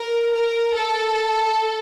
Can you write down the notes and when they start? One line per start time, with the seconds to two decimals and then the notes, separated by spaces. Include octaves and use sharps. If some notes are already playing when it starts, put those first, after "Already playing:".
Already playing: A#4
0.33 A#4
0.76 A4